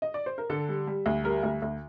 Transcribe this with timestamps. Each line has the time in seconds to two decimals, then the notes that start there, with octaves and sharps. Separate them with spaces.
0.02 D#5
0.14 D5
0.26 C5
0.38 A#4
0.50 D3 A4
0.69 G3
0.87 G3
1.06 D2
1.24 G3 A#4
1.43 D2
1.62 D2